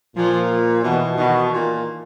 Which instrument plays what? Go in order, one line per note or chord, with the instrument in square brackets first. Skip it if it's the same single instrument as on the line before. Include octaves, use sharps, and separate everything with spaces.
[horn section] A#2 [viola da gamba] F3
[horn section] B2 [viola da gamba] E3
[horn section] B2 [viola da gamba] D#3
[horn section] A#2